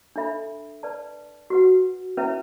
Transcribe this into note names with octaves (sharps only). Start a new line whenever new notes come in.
D4 A4 E5 B5
B4 D5 A5
F#4 B4 F#5
C#4 E4 B4 E5